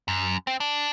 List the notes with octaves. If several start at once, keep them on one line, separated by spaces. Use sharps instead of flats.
F#2
C4
D4